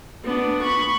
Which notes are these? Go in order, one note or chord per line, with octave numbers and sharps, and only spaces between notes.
B3 D4
B5 C#6